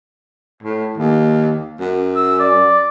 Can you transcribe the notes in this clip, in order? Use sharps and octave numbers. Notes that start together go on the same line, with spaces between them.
A2
D#2
F#2
E6
D5